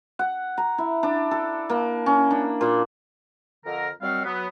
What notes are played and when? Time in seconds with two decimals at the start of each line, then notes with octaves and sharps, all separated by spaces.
0.19 F#5
0.58 A#5
0.78 E4
1.03 D4
1.31 A4
1.69 A#3
2.06 C#4
2.31 D4
2.61 A#2
3.65 F2 D3 A#4 A#5
4.02 D#3 F#3 G3 C4 F#4 F5
4.25 F#3 B3